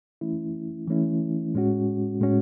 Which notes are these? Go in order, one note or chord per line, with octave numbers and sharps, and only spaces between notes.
E3 A3 C#4 E4
E3 A3 C#4 E4
A2 G#3 C#4 F#4
A2 G#3 C#4 F#4